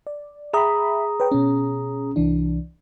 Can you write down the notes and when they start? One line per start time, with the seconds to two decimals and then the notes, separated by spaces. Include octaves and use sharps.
0.07 D5
0.54 G#4 E5 G5 A#5 B5 D#6
1.20 B4 C#5 G5
1.31 B2 C#4
2.16 C2 E3 D4